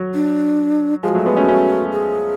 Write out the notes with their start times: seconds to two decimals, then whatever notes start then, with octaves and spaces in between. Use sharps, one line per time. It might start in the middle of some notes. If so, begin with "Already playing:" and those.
Already playing: F#3
0.14 D4
1.03 F3 G#3 G#4
1.08 F#4
1.14 F#3 A3
1.26 G#3 B3
1.37 A3 C#4
1.48 A3 C#4
1.93 G#4